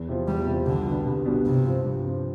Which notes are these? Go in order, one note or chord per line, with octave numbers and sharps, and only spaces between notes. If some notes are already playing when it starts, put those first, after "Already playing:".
Already playing: E2
C3 F3
E2 G3
C3 F3
C2 D3
B2 G3 B3 D4
C2
B2 G3 B3 D4
G2 C3
F3 C4
G2
F3 C4